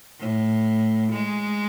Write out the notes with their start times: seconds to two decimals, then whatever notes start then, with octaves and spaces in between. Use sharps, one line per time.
0.20 A2
1.12 G#3